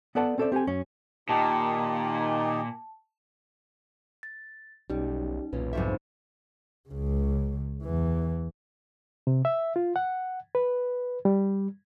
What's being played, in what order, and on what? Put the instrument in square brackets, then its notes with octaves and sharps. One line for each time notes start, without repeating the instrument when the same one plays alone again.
[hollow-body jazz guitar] B3 A4 B4 D5 F#5 A5
C4 C#4 A4 C5 D5 E5
C4 G4 A4 G#5
F#2 C#4
[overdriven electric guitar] A#2 [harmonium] D#3 D#4 G4 [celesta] A5
[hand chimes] A6
[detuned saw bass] B1 [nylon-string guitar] G3 [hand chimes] C#4 D#4
[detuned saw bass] B1 [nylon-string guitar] E2 A#2 C#4 [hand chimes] B4
[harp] C2 F2 G#2 [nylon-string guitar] E5
[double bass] C#2 C#3
E2 E3
[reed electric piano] C3
E5
F4
F#5
B4
G3